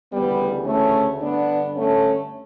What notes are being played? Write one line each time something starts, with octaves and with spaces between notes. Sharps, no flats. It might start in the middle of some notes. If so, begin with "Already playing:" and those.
D2 C#3 E3 G3 B3
A3 C#4
G2 D3 B3 D4
A3 C#4